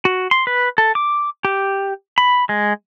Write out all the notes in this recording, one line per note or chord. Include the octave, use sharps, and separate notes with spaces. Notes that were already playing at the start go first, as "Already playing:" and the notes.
F#4
C6
B4
A4
D6
G4
B5
G#3